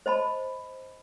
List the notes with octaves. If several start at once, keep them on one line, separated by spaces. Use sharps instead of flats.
C5 D#5 A5 B5